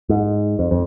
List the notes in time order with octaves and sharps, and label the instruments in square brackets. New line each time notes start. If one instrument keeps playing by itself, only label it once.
[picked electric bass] G#2
F2
F2